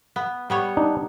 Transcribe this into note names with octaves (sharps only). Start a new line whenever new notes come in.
B3
G3 B3 C#5
D4 D#4